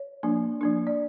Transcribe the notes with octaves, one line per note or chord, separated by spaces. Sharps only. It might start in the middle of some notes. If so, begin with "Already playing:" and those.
Already playing: C#5
F3 A#3 D4
F3 A#3 D4
D5